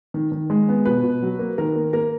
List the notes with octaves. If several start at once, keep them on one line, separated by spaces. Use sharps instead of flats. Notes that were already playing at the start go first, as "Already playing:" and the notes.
D#3
D#3
G#3
B3
B2 B4
B2
F#3
A#3
D#3 A#4
A#3
A#3 A#4